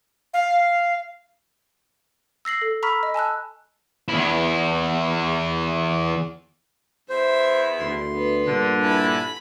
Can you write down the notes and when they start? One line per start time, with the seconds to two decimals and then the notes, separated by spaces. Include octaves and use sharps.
0.34 F5
2.45 E6 A#6 C7 F#7
2.62 A4
2.83 A#5 B5 C#6 E6 F6 B6
3.03 D#5
3.14 G#5 A5 E6 F#6
4.08 E2 E4
7.10 E2 C5 E5
7.79 D2 C6
8.13 B3
8.47 G2 A#2 D3
8.83 E4 G#5 A5 B5